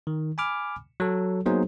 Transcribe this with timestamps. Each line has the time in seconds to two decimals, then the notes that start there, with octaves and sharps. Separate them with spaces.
0.07 D#3
0.38 G#5 B5 D6 F6
1.00 F#3 A4
1.46 F#3 A#3 B3 D#4 G#4 C5